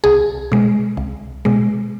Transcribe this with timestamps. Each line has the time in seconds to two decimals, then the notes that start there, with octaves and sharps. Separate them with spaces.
0.04 C2 G#4
0.52 B2 G#3
0.97 C2
1.45 B2 G#3